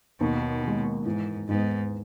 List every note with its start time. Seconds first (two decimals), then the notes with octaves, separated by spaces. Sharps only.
0.21 D#2 B2
0.64 D#3 G#3
1.06 G#2 E3
1.48 G#2 B3 D#4